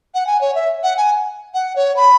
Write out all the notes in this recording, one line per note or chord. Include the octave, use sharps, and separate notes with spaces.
F#5
G#5
C#5
E5
F#5
G#5
F#5
C#5
B5